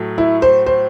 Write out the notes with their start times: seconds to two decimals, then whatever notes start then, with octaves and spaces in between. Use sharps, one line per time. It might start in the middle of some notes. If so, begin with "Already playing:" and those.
Already playing: A2 F#3 A3
0.18 E4
0.42 C5
0.66 C5